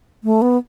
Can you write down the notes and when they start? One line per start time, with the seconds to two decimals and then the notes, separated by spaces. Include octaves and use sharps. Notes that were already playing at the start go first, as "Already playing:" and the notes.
0.24 A3
0.42 B3